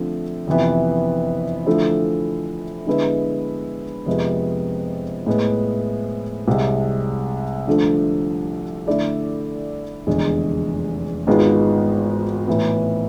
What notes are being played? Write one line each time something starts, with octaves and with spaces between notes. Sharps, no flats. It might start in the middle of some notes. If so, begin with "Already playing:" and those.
Already playing: D3 F3 A3 C4
F2 C3 E3 B3
D3 F3 A3 E4 A4
D3 G#3 B3 E4 B4
F2 C3 G#3 B3
A2 G#3 B3
C2 C3 G#3
D3 F3 A3 D4 A4
D3 A3 E4 A4 D5
F1 E2 D3 G#3
G#1 G#2 G#3 B3 F4
A2 E3 B3